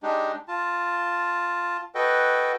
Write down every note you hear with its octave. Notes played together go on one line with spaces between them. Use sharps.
G#3 D4 D#4 G4
F4 A5
F#4 A4 B4 D#5 G5